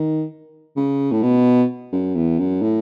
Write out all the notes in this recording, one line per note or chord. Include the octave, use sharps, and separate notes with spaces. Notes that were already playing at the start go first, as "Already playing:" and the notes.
Already playing: D#3
C#3
A2
B2
F#2
E2
F#2
A2